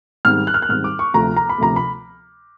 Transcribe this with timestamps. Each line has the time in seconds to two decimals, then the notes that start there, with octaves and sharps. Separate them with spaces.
0.25 G#2 D#3 G3 C4 F6
0.47 F#6
0.54 F6
0.62 F#6
0.69 G#2 D#3 G3 C4 F6
0.84 D6
0.99 C#6
1.14 D2 C3 F3 A3 A#5
1.37 A#5
1.49 B5
1.58 D2 C3 F3 A3 A#5
1.76 B5